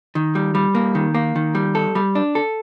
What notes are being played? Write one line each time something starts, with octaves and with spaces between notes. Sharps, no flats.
D#3
G3
G3
A#3
D#3
A#3
D#3
G3
A4
G3
D4
A4